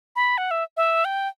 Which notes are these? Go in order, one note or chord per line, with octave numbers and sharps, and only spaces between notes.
B5
F#5
E5
E5
G5